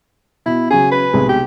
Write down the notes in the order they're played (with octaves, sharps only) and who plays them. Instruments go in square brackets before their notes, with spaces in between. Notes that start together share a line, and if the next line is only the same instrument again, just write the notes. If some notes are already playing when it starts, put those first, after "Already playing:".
[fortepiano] B2 [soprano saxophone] E4
[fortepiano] C#3 F#3 [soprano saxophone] G#4
[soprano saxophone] B4
[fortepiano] B1 C3 G#3
[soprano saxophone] G4